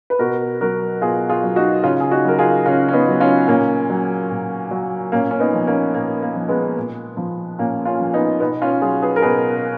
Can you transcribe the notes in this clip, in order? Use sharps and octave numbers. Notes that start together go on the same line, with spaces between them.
B4
B2 F#4 A#4
F#3 F#4 A#4
B2 F4 G#4
F4 G#4
F#3
D#4 F#4
C#3 C#4 F4
G#4
D#4 F#4
F#3 A#4
F4 G#4
C#3 C#4 F4
C#4
B3 D#4
F#3
C#4 F4
A#2 A#3 C#4
F#3
A#2
F#3
A#2 A#3 C#4
C#4
B3 D#4
F3
A#3 C#4
A#2 A#3
A#3
F3
G#3 B3
A#2
F3
A#2 A#3 C#4
C#4 F4
F3
B3 D#4
B2 B3 D#4
C#4 F4
F#3 F4 G#4
G#4 B4
A#4
B2 G#4 B4